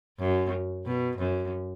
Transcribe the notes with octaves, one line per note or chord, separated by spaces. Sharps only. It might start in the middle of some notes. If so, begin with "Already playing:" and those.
F#2
B2
F#2